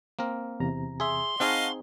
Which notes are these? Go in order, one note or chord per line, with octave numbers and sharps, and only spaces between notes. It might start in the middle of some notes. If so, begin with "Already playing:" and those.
A#3 C4 A#4
E2 C3 A#5
G#4 E5 C6
C4 D#4 G#4 D#5 F5 F#5 A5 C#6